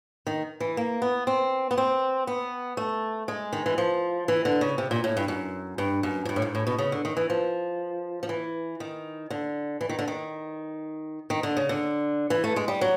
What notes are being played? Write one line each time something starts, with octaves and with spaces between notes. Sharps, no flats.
D#3
E3
A#3
B3
C4
B3
C4
B3
A3
G#3
D#3
E3
F3
E3
D3
C#3
C3
A#2
A2
G2
F#2
G2
F#2
G#2
G2
A2
G#2
A2
B2
C#3
D3
D#3
E3
F3
F3
E3
D#3
D3
E3
D#3
D3
D#3
D#3
D3
C#3
D3
E3
A3
G#3
G3
F#3